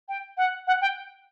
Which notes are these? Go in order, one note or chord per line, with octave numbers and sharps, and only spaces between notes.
G5
F#5
F#5
G5